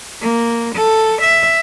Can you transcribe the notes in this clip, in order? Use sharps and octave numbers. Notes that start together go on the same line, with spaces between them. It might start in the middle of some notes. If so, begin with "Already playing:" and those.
A#3
A4
E5